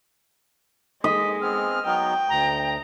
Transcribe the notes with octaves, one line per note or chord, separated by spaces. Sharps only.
G#3 D#5 B6
B3 C4 G#4 F6
F#3 B3 D#4 G5
D2 A#5